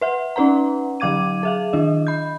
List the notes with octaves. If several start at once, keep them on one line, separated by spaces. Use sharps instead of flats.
B4 E5 F#5
C#4 D#4 B4 F#5 A#5
D3 F#3 F5 D6 G#6 D#7
G#4 E5 F5
D#3 D4 D#5
B5 G6